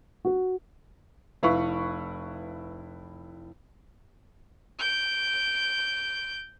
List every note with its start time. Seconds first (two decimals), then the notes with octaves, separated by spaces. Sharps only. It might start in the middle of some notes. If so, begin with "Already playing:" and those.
0.25 F#4
1.43 F1 E4 B4 F5 B5 C#6
4.79 G6 D7